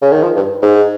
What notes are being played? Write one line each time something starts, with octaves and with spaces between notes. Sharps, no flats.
C#3
D#3
F3
G2
G#2